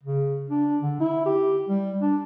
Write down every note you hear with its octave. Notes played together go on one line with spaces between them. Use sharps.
C#3
D4
D3
E4
G4
G3
D4